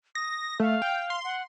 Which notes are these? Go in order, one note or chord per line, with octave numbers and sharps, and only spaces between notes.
D#6 A#6
A3 F5
G5
C6
F#5